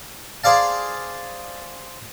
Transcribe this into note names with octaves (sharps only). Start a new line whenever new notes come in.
G#4 C5 D5 F5 A5